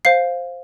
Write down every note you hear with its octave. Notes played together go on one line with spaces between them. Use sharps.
C5 F5 C7